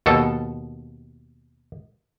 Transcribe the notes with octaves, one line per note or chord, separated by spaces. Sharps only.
D#2 B2 A4